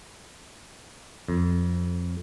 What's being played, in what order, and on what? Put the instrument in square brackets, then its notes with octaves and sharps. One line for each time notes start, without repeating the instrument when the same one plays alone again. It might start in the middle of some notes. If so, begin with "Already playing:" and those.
[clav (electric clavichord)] F2